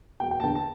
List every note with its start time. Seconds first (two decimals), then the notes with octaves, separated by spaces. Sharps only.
0.20 E1 G5
0.31 G5
0.40 A5
0.43 E2 D3 G5
0.55 A5